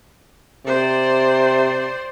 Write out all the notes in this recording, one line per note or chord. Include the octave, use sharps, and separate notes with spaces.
C3 C5 D5